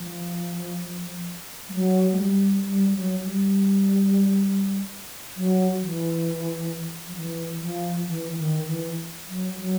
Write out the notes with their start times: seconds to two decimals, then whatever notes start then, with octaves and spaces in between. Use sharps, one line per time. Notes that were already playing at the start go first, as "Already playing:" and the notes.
Already playing: F3
1.69 G3
1.74 F#3
2.12 G#3
2.19 G3
2.64 G3
2.95 F#3
3.25 G3
5.37 F#3
5.81 E3
7.07 F3
7.16 E3
7.62 F3
8.07 E3
8.38 D#3
8.67 E3
9.29 F#3
9.59 F#3